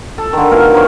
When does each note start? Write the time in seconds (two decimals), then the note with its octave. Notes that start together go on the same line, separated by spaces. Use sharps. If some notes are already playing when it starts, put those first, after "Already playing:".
0.18 A4
0.33 D3 D#3
0.51 B2 A#4 F5
0.74 D#4 C5 C#5